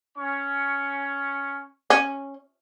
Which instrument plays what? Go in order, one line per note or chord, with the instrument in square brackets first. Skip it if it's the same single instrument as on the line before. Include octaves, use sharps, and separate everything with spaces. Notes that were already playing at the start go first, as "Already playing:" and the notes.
[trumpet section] C#4 C#6
[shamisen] C#4